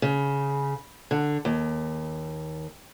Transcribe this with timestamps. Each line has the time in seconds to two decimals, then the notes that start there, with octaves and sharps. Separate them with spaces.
0.02 C#3
1.11 D3
1.45 D#2